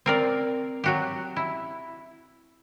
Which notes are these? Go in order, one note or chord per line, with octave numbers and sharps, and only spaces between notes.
C4 A#4 D5
F#3 F#4 G4
E4